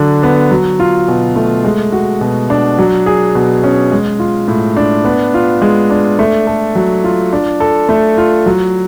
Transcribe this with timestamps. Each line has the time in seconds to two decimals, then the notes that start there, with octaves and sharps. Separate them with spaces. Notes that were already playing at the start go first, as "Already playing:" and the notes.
Already playing: D3 F#3 D4
0.23 B3
0.51 F#3
0.80 F4
1.08 B2
1.36 A3
1.64 G#3
1.92 F#4
2.21 B2
2.50 D4
2.78 F#3
3.06 G#4
3.35 B2
3.64 C#4
3.92 G#3
4.19 F4
4.48 A2
4.77 D4
5.05 B3
5.34 F4
5.62 G#3
5.90 D4
6.19 A3
6.47 A4
6.75 F#3
7.04 F4
7.33 D4
7.60 A4
7.89 A3
8.18 F4
8.46 F#3